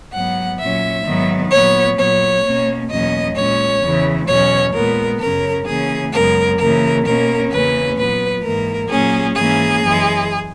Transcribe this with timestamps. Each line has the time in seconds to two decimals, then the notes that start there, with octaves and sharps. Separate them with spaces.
0.14 G#2 F#3 B3 F#5
0.60 A#2 F#3 C#4 E5
1.06 G#2 D#3 F#3 B3
1.52 A#2 F#3 B3 C#5
1.98 A#2 F#3 B3 C#5
2.45 B2 A#3 C#4
2.90 E2 B2 F#3 A#3 C#4 D#5
3.36 A#2 G#3 C#4 C#5
3.83 E2 C#3 E3
4.28 E2 B2 F#3 C#4 C#5
4.74 A#2 G#3 B3 A#4
5.21 F#2 C#3 F#3 C#4 A#4
5.67 C#3 E3 A#3 C#4 G#4
6.13 F#2 C#3 G#3 B3 A#4
6.60 C#3 E3 A#3 A#4
7.06 B2 A#3 C#4 A#4
7.52 E2 C#3 E3 A#3 C#4 B4
7.98 A#2 F#3 B3 B4
8.44 G#2 E3 A#3 A#4
8.90 A#2 F#3 A#3 C#4 G#4
9.36 G#2 E3 A#3 C#4 G#4
9.83 F#2 E3 G#3